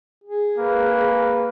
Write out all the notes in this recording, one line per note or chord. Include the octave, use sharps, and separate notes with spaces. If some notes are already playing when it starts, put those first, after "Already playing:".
G#4
A#3 B4